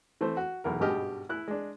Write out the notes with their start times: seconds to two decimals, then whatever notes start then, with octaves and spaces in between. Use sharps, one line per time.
0.21 E3 A3 C4 C5
0.37 F#4
0.64 B1 E2 A#4
0.80 G#1 G2 B2 G4 D#5 F6
1.29 E4 F#6
1.48 G#3 D4